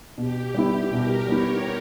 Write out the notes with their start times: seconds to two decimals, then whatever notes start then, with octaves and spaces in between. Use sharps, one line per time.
0.18 B2 G4
0.54 G3 B3 E4 G4
0.91 B2 A#4
1.28 G3 B3 E4 C#5